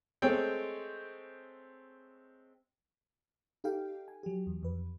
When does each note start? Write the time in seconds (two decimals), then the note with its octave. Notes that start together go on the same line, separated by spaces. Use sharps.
0.22 G#3 A3 C4 C5 C#5 G5
3.64 D#4 G4 A4 F5 G5
4.08 G#5
4.23 F#3 G4
4.47 E2
4.63 F2 B4